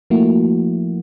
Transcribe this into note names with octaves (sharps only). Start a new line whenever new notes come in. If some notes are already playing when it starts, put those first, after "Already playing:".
F3 A3 A#3 E4 F#4